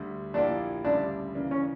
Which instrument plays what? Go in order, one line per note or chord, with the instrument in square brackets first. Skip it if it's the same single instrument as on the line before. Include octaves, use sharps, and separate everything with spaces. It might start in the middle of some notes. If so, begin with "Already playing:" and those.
Already playing: [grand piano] D2 D3 G3
[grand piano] A#1 A#2 A#3 E4 G4 [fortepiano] D4
[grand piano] D2 C#3 G3 [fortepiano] D4
[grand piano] C#3 E3 A#3 D4
[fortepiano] C#4